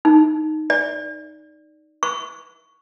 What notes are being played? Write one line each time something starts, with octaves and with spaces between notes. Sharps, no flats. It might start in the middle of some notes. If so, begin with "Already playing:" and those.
D#4
D5
C#6